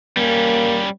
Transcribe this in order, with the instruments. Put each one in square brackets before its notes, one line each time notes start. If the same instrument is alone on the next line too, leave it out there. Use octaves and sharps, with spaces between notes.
[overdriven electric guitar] G3 C#4 [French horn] A#3